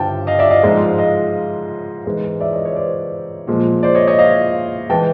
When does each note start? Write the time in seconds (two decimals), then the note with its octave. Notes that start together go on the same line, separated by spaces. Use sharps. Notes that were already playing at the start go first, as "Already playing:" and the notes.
Already playing: G2 D3 G3 G5 A5
0.27 D#5 F5
0.39 D5 E5
0.50 D#5 F5
0.63 G#2 F3 G#3
0.98 D#5 F5
2.06 G#2 E3 G#3
2.40 D5 E5
2.53 C#5 D#5
2.65 B4 C#5
2.76 C5 D5
3.47 A#2 F3 G#3
3.83 C5 D5
3.95 C#5 D#5
4.07 C#5 D#5
4.19 D#5 F5
4.90 E3 G#3 G5 A5